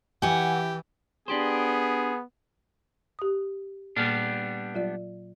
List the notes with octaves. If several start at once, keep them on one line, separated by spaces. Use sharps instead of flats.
E3 G4 F#5 G#5
B3 D4 G4 G#4 C5
G4 D#6
A#2 G3 A#3 B3 D4 F6
F#3 F4 D5